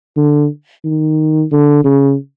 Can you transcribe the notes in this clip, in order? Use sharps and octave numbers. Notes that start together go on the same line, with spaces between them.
D3
D#3
D3
C#3